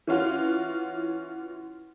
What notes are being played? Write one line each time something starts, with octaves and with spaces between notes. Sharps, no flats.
E3 C#4 F4 F#4